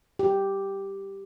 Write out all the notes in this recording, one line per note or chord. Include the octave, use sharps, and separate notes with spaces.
G4